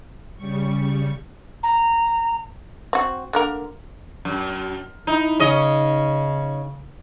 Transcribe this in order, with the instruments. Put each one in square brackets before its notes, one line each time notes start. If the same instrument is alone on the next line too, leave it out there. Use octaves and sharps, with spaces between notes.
[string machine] C#3 G3 C#6
[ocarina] A#5
[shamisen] C4 F#4
D3 A#3 A#4
[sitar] F#2
[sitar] D#4 [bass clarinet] E4
[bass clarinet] C#3 [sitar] C#4 D#5